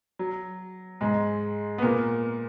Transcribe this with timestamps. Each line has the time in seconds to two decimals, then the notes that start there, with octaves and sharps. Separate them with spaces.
0.19 F#3
1.01 G#2 G#3
1.78 B3
1.82 A#2 A#3